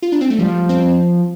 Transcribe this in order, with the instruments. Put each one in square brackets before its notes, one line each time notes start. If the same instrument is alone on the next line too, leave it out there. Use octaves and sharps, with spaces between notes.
[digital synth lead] F4
D4
C4
A3
[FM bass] F3 [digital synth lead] G3
[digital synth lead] C4